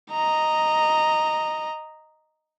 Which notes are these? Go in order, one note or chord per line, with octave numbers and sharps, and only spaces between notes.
D#5 A#5